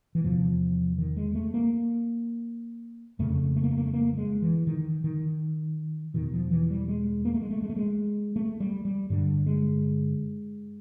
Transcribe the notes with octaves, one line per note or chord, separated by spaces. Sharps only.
E3
E2 C3 F3
D#3
G#3
A3
A#3
F2 C#3 A3
A3
A#3
A3
A#3
A3
A#3
A3
G#3
E3
D#3
D#3
E2 B2 D#3
F3
E3
G3
G#3
A#3
A3
G#3
A3
G#3
A3
G#3
A3
G3
G3
G2 D3 G3
G#3